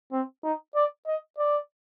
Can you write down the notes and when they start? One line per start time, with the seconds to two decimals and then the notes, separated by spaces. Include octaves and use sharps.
0.12 C4
0.43 D#4
0.75 D5
1.07 D#5
1.38 D5